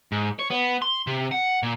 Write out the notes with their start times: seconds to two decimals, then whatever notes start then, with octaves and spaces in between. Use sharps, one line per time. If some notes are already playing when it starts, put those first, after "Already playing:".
0.12 G#2
0.39 C#5
0.51 B3
0.82 C6
1.07 C3
1.32 F#5
1.63 A#2